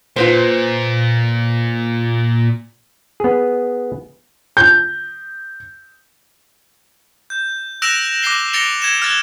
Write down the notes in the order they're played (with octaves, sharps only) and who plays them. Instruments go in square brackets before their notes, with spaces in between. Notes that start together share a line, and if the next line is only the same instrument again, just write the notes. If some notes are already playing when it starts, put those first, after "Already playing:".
[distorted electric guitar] A#2 [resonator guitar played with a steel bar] F4 B4 C5
[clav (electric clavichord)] B3 G#4
[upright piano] G6
[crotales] G6
E6 F#6 A#6 D7 E7 F7
D6 F#6 A#6 C7 G7
A6 A#6 C#7 D7 F7 G7
G#6 E7
F6 F#6 A6